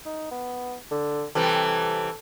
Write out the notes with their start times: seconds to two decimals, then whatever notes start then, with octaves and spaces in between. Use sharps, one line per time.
0.05 D#4
0.31 B3
0.91 D3
1.35 C3 E3 G3 A4